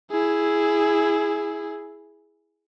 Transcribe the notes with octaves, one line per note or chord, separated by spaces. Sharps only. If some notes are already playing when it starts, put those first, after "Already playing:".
E4 G#4